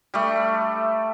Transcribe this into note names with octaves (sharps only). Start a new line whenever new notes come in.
G3 A3